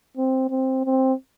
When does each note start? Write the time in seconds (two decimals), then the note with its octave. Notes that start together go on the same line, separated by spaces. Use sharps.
0.17 C4
0.50 C4
0.85 C4